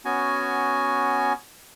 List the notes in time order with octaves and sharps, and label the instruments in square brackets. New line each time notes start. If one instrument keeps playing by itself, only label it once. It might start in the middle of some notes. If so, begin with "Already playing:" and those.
[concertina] B3 C#4 F#4 G#5